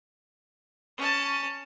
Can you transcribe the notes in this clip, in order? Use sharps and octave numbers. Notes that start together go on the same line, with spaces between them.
C#4 A5